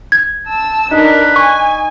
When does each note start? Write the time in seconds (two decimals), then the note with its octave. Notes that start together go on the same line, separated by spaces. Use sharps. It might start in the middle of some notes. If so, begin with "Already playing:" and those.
0.12 G#6
0.47 A5 E6
0.91 D4 D#4 A#4 B4
1.36 G#5 C#6